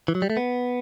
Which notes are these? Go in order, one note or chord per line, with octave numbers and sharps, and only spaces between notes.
E3
F#3
G3
A3
B3